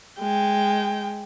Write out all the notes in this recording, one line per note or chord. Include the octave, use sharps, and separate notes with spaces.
G#3 G5